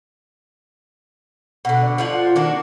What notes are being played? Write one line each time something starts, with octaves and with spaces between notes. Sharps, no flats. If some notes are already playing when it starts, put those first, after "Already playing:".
B2 D3 F#5
D5
F3 F4 F#5
D#3 A#3 D4 F#4